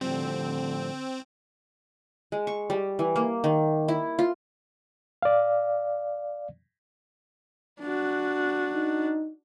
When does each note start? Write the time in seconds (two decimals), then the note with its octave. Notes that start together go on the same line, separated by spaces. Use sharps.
0.01 A2 D3 F3 G3 C4
2.32 G#3
2.47 C#6
2.70 G3
2.99 E3
3.16 A#3
3.44 D#3
3.88 E4
4.19 F4
5.22 D5 F5
7.80 D4 F#4
8.75 D#4